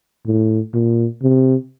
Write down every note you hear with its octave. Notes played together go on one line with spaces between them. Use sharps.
A2
A#2
C3